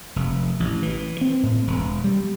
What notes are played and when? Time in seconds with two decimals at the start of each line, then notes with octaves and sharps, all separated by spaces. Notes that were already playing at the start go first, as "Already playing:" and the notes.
0.16 F1
0.60 A1
0.83 E3
1.21 C4
1.43 A2
1.67 E1
2.04 G3